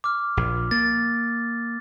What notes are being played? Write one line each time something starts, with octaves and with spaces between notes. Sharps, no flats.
D6 F6
A#1
A#3 A6